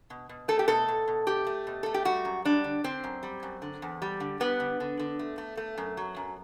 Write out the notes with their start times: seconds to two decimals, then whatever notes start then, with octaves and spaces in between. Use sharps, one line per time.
0.10 B2
0.29 B2
0.48 A3 A4
0.59 G4
0.68 B2 A4
0.88 B2
1.08 B2
1.27 A3 G4
1.47 A3
1.67 B2
1.83 A3 A4
1.94 G4
2.05 G3 F#4
2.25 F#2
2.45 G3 D4
2.64 D3
2.84 D3 C4
3.04 F#2
3.23 G3
3.43 F#2
3.62 D3
3.82 E2
4.02 G3
4.20 D3
4.40 G3 B3
4.60 D3
4.80 D3
4.99 D3
5.19 A3
5.38 A3
5.57 A3
5.78 F#2
5.97 F#3
6.16 F#2